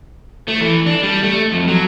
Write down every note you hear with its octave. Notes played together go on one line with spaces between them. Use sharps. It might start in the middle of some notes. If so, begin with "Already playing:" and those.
A3
E3
D4
G3
A3
F2
F#3